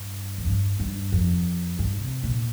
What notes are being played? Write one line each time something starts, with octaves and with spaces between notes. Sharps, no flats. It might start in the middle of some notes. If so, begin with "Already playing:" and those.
Already playing: G2
F2
G2
G2
F2
G2
C3
A#2